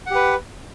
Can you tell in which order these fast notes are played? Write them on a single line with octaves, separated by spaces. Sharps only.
F#5 G4 B4